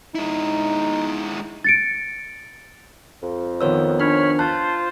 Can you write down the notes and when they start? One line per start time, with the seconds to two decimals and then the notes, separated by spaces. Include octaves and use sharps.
0.15 G#3 D#4 E4
1.64 A6 C#7 D7
3.22 F2
3.61 D#3 F3 B3 C5 C#5 E6
4.00 D4 C#5 B5 F6
4.39 F4 C5 A5 F#6